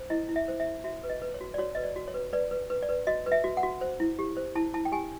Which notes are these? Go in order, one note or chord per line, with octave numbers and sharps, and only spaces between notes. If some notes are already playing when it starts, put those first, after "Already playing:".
Already playing: C5
E4 D#5
E4
E5
C5
E5
E4
F#4 E5
B4
D#5
B4
C#5
F#4
D5
F#4 C#5
B4 D#5
D5
F#4
C#5
B4
B4 D5
B4
B4
D5
B4
F#4 D#5
B4
E5
F#4
F#5
F#4
C5
E4
G4
C5
E4 A5
E4 A5
G5
G4 G#5